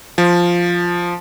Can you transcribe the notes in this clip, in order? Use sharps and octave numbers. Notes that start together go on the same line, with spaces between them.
F3